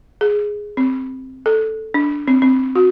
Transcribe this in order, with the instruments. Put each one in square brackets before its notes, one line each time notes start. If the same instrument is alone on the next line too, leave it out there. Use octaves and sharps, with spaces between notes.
[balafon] G#4
C4
A4
D4
C4
C4
F#4